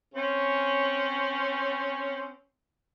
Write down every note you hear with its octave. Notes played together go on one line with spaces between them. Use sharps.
C4 C#4